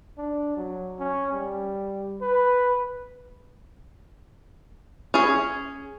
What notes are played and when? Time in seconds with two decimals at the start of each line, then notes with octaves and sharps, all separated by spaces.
0.18 D4
0.57 F#3
0.99 C#4
1.32 G3
2.21 B4
5.14 C#4 G#4